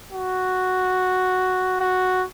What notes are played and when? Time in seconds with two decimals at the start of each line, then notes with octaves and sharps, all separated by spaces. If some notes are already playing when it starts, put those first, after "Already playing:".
0.13 F#4
1.80 F#4